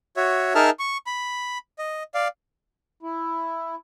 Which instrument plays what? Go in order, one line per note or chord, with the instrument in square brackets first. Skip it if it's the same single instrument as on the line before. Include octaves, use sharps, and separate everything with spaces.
[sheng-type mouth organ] F#4 C#5 E5
D#4 G#4 A#4 E5 A5 F6
C#6
B5
D#5
D5 F5
[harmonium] E4